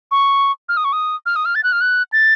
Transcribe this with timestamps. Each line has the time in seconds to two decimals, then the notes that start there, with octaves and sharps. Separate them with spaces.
0.11 C#6
0.69 F6
0.77 D#6
0.85 C#6
0.93 D#6
1.26 F6
1.36 D#6
1.45 F6
1.55 A6
1.63 F#6
1.72 F6
1.81 F#6
2.12 A6